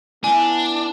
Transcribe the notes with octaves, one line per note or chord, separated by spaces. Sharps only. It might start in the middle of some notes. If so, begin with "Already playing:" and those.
B3 D4 E4 G#5